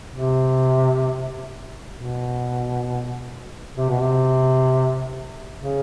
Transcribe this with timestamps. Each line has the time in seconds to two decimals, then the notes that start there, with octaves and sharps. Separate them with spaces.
0.12 C3
1.95 B2
3.77 C3
3.89 B2
4.00 C3
5.58 C#3